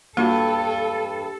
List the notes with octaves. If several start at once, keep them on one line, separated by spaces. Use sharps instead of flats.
G2 A#3 F4 F#4 A4